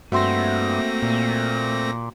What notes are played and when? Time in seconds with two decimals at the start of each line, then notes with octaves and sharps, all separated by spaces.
0.12 G2 A3 A#3 C4 F#4 E5 C6 A#6
1.02 A#2